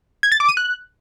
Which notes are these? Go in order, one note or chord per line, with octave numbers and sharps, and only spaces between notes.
G#6
A6
D6
D#7
F#6